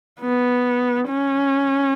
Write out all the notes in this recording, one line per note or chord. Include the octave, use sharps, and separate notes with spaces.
B3
C#4